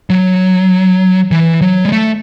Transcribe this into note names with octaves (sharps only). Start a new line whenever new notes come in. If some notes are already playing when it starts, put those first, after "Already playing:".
F#3
E3
F#3
G#3
A3